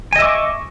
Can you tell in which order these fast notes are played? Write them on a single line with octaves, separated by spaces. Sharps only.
G#5 D#5 E5 D6 C#6